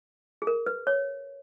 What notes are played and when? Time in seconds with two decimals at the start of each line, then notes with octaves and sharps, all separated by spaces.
0.42 G#4
0.47 A#4
0.66 B4
0.87 C#5